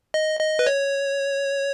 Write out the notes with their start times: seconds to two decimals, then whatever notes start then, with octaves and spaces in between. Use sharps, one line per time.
0.14 D#5
0.40 D#5
0.59 B4
0.67 C#5